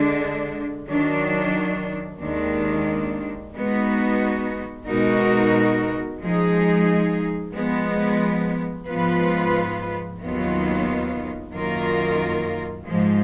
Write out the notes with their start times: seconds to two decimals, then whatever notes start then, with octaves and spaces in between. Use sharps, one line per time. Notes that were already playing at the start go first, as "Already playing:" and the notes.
Already playing: D3 G#3 D4
0.88 D#3 F#3 D4
2.21 D#2 D#3 G#3 D4
3.53 G#3 B3 D#4 F#4
4.87 B2 G#3 D#4 F#4 A#4
6.20 F3 G#3 D#4 G#4
7.53 F3 G#3 B3
8.87 G#2 F3 B3 F4 B4
10.20 D#2 D#3 F#3 B3 F4
11.53 F#2 D#3 A#3 F4 A#4
12.86 G#2 F3 G#3